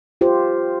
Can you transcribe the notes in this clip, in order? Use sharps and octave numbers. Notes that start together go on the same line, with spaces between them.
F4 G4 C5